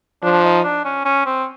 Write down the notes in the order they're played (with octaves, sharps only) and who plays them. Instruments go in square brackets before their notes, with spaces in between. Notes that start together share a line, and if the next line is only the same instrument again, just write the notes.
[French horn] F3 [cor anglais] D4
[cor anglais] D#4
D4
C#4
C#4
C4